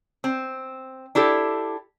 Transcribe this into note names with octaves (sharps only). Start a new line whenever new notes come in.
C4
D4 E4 G4 A4